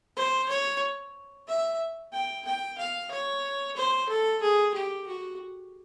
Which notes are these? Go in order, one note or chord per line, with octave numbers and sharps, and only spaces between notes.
C5
C#5
E5
G5
G5
F5
C#5
C5
A4
G#4
G4
F#4